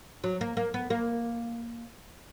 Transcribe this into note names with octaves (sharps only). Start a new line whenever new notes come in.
F#3
A#3
A#3
B3
A#3